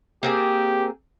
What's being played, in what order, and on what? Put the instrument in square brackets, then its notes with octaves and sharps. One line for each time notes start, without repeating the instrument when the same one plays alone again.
[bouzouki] A#3 C4 G#4 [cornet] G4